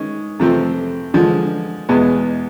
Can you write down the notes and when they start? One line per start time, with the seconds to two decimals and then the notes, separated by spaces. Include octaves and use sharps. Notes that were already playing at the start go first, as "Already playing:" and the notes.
Already playing: D#3 G#3 C#4
0.39 F2 C3 F3 A3 C4
1.14 D3 F3 G#3
1.89 E2 B2 G#3 B3